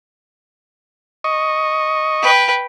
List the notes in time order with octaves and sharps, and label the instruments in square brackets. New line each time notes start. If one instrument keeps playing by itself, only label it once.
[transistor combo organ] D#5 C#6
[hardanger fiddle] B4 G5